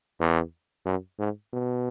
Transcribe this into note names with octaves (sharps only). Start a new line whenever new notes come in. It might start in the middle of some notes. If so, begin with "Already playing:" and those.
E2
F#2
G#2
B2